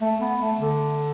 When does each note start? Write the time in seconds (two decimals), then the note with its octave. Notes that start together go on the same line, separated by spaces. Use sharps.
0.01 A3
0.21 B3
0.40 A3
0.59 D3